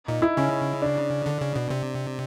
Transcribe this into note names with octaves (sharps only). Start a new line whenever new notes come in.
A#2 D#4
E4
C#3 C#4
D4
D3
C#3
B2
C3